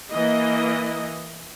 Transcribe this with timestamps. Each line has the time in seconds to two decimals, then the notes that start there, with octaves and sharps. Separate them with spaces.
0.12 E3 A#3 D#5